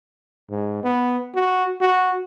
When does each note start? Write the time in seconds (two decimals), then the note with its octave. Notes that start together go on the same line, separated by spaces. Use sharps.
0.50 G#2
0.83 B3
1.35 F#4
1.81 F#4